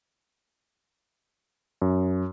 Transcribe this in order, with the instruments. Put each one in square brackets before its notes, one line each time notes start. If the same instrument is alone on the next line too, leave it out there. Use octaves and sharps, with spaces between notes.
[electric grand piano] F#2